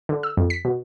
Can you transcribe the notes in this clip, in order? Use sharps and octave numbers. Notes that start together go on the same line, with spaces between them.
D3
E6
F2
B6
B2